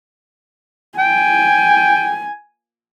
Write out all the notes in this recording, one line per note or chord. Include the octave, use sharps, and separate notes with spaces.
G5 G#5